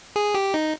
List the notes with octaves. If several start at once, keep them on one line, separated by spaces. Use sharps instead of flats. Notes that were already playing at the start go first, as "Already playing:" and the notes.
G#4
G4
D#4